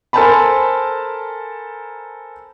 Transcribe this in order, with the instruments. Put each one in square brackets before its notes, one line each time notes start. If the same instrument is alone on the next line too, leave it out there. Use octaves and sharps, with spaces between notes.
[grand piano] A4 A#4 C5 G#5 A5 B5